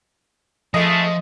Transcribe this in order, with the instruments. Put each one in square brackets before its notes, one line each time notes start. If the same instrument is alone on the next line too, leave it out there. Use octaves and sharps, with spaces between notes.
[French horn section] C#3 G#3 A3 [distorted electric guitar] F3 [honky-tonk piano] D#5